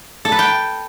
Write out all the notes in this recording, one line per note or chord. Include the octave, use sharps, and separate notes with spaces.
A4
B4
G5